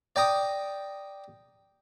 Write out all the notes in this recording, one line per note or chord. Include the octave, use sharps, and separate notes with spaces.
D5 G5 A#5 D#6